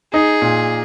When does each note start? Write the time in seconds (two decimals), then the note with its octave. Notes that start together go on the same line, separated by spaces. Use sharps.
0.13 D#4 G#4
0.42 A#2